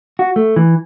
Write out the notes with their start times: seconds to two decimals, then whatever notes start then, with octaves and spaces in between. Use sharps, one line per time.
0.19 F#4
0.36 A3
0.56 E3